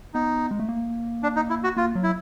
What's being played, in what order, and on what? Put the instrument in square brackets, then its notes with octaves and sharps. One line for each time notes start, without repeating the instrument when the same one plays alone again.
[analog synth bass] B3 [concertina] D#4
[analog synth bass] G#3
A3
A#3
[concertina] D4
D#4
E4
F#4
[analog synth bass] A#3 [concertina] F4
[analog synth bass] F#3
[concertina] E4